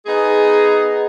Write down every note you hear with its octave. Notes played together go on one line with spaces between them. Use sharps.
B3 D#4 G#4